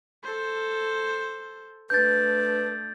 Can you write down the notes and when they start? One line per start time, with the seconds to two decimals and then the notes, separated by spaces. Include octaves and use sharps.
0.23 A4 C5
1.90 A3 D4 B4 G6 A6